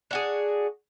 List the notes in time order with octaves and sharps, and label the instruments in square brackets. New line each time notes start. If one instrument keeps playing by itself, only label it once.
[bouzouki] D4 F#4 G#4